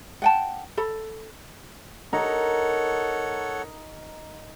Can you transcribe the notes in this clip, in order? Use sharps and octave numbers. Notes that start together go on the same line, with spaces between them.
F#5 G5 A5
A4 B5
D#4 A4 A#4 C#5 F#5 A#5